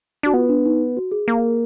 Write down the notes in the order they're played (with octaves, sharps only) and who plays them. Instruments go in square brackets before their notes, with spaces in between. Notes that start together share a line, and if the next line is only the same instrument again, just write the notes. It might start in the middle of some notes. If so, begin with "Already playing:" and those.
[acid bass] D4 [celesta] F#4
[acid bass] B3 [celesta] F4
[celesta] D4
D#4
F#4
G#4
[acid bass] A#3